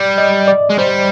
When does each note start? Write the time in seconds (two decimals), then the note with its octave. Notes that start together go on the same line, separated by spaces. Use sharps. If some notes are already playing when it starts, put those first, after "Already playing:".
Already playing: G3 D5
0.18 D#5
0.48 D5
0.70 G#3
0.79 G3 C5